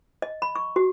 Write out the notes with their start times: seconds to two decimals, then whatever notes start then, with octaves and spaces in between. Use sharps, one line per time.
0.22 D#5
0.42 B5
0.55 C#6
0.76 F#4